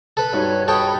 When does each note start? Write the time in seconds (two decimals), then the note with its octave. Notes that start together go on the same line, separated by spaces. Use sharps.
0.17 A4 B4
0.32 G2 D#4 F#4 C#5
0.68 A4 C#5 G5 B5 D#6